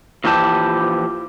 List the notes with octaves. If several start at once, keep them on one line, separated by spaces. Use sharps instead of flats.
A#2 E3 F3 G4 A5